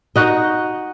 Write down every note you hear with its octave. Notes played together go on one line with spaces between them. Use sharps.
D#4 F#4 D#5